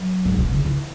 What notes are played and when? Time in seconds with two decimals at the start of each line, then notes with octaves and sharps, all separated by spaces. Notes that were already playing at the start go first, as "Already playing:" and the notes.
Already playing: F#3
0.25 G#2
0.38 B2
0.52 C#3
0.65 E3